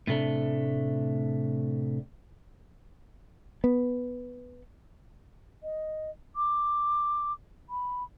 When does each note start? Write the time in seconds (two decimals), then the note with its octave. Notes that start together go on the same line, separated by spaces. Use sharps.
0.07 A2 C3 A3 D4
3.64 B3
5.63 D#5
6.36 D6
7.70 B5